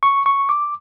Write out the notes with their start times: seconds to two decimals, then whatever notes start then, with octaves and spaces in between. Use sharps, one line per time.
0.03 C#6
0.26 C#6
0.49 D6